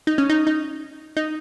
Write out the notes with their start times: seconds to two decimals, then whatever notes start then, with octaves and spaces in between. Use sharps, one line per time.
0.07 D#4
0.18 C#4
0.30 D#4
0.47 D#4
1.17 D#4